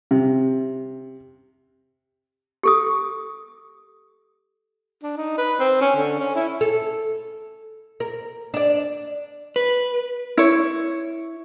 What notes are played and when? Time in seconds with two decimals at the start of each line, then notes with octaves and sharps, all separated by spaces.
0.11 C3
2.63 G4 A4 D#6
5.02 D4
5.17 D#4
5.38 B4
5.59 C4
5.81 C#4
5.96 D3
6.19 C#4
6.35 E4
6.61 A4
8.00 A#4
8.54 D4 D5
9.56 B4
10.37 E4 C#5